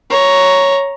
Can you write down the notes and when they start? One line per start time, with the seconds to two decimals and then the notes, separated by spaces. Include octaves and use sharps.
0.10 C#5 A#5